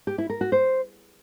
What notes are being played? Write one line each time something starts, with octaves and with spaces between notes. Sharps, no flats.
G4
E4
A#4
F#4
C5